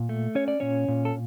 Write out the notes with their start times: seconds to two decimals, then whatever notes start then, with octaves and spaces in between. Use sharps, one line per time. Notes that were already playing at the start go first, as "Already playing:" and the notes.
Already playing: A#2
0.09 A3
0.35 C#4 C#5
0.48 D5
0.60 A#2 C#4 C#5
0.88 A#2
1.05 A4